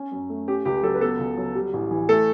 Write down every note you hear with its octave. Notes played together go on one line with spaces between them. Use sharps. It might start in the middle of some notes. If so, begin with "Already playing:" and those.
Already playing: C#4
F#2
A3
C#4 G4
C#2 G4
F#3 A4
B4
B3 A4
C#2
F#3
G3
A1
E3
A3 A4